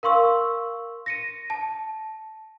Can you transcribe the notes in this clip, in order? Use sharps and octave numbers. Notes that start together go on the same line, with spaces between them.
A#4 F5 C6 C#6 E6
A#6 C#7 D#7
A5